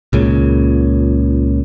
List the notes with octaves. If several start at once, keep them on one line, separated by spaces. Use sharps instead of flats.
C#2 A#2 C#3